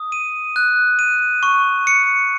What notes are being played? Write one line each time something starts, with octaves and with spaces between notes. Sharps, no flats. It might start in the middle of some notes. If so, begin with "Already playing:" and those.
Already playing: D#6
D#7
F#6
D#7
C#6
C#7